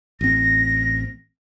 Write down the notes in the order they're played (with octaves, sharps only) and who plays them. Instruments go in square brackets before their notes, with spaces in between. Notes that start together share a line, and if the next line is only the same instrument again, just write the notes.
[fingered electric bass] A1 C4 [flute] A#6